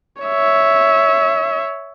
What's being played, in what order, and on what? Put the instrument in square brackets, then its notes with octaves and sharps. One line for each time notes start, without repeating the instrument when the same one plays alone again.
[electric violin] C#5 E5